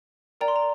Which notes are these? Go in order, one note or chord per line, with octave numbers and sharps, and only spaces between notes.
A#4 D5 G5 A#5
C6
A#5